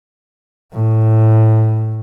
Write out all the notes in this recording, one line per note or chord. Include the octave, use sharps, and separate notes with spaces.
A2